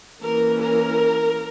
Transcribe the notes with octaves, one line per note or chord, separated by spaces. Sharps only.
E3 A#3 C#4 A#4
A#4